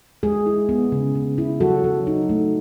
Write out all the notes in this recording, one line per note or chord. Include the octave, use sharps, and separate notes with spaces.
G#3 G#4
E4
B3
C#3
C#3
E4
F#3 F#4 A4
F#3
D#4
A3